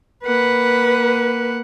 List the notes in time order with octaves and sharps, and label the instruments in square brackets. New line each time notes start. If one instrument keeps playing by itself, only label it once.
[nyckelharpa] A#3 F#5 [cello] B4